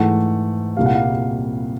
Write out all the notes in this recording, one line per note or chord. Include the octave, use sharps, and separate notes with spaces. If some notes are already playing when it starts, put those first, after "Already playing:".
Already playing: G#2 E3 A3 F#5
C2 A#2 G3 F5
F#5
F5